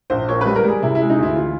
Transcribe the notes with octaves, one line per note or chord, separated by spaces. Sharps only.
A#1 C5
A#2 C#5
G3 B4
A#4
G3 G#4
C3 E4
E4
G#3
D#4
D2 E4
E3 F4